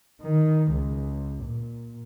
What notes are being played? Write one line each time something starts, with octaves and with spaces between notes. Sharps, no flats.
D#3
C#2
A#2